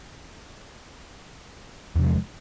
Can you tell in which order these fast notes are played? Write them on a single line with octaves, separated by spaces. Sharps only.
E2 C3 F3 G#3